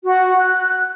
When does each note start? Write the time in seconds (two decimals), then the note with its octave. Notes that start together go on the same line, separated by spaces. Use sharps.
0.04 F#4
0.38 F#6